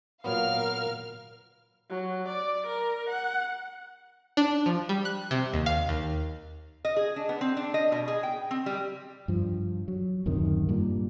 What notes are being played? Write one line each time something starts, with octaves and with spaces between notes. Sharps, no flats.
A#2 F#3 B3 A#4 F5 F6
F#3
D5
A#4
F#5
D4
F3
G3
F#6
C3
D#2
F5
D#2
D#5
G#4
D4
B3
C4
D4
D#5
B2
G#4
G5
C4
G3
G2 F3
F#3
D1 F#2 C3 D#3
G2 A#2 G3